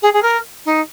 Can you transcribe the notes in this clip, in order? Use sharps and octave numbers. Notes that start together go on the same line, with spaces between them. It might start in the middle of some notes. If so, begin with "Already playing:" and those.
G#4
G#4
A#4
D#4